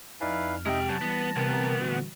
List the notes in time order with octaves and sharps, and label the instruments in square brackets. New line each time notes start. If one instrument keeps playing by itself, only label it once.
[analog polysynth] F2 F6 [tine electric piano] D#4 D5 G#5 [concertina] E4 B4 F5
[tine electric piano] C3 G4 [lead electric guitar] G#3 G5 [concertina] D#4 D#5 E5
[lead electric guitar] F#2 [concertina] A5
[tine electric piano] E3 G3 [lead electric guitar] B3 [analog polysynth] A#6
[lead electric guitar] D2 B3 [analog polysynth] C3 A#4 G5
[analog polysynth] A#2 D3 F#4